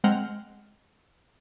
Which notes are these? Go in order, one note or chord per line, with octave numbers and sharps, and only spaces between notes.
G#3 C4 F#5 A#5 F6 G6